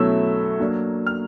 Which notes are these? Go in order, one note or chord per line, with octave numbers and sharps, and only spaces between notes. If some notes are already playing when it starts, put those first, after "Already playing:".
Already playing: B2 F#3 A3 C#4 E4 E6
F#3 A#3 D4
F6